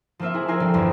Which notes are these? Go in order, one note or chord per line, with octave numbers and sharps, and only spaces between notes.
F3 A#3 C4 F4 E5
E4 G#4 G#5
C4 E4 F4 A#4 C5 G#5
F3 G3 C4 D4 A4 D5
G1 E2